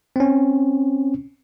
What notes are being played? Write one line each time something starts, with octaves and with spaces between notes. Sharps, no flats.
C4 C#4